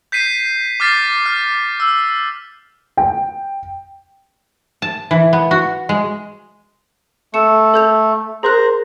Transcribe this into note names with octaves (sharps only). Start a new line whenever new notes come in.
G6 B6 C7 D#7
D6 F6 A6 B6 C7
F6
E6
G5
A5
E3
B3
F#4
G#3
A3 C#7 E7
A4 G6 F7
G#4 A#4 C5 A#5 F#6